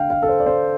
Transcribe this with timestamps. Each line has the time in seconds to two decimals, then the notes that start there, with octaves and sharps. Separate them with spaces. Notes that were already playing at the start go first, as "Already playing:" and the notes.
Already playing: D3 A3 F5 G5
0.10 F5
0.22 A4
0.29 C5
0.40 D5
0.46 C5